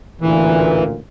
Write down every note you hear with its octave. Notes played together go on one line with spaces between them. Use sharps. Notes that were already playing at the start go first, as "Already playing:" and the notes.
A1 D2 A#2 E3